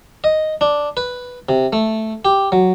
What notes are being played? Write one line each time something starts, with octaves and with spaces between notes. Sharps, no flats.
D#5
D4
B4
C3
A3
G4
F#3